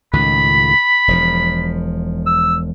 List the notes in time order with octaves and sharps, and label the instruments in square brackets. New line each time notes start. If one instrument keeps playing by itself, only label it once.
[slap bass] C#2 A2 D#3 [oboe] B5
[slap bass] E1 F3
[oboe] E6